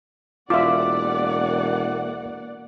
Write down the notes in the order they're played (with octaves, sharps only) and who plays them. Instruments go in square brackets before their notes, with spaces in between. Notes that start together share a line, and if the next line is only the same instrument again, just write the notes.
[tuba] E1 [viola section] A#3 D5 F#5 [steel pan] F4 E5 [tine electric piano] D6